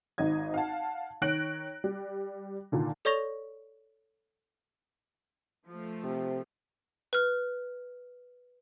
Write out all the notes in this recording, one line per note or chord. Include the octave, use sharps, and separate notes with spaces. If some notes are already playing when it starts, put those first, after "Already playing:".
G#1 G#2 D#5 G#6
F5 F#5 A5
D#3 C#5 F#6 A#6 D7 F#7
G3
A#2 D3 D#3
A4 C#5 D5 C#6 A#6 F7
F3 A3
C3
B4 F6